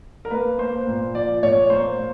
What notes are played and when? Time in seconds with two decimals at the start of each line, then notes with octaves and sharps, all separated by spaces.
0.25 A#4
0.30 A#3 B4
0.58 A#3 C5
0.87 A#2
1.15 F3 D5
1.43 A#2 C#5
1.70 A#3 C5
1.98 A#3